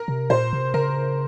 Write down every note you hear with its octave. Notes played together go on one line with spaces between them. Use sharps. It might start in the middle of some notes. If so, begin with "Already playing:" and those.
Already playing: A#4
C3
A#2 C5
C3
C#3 A#4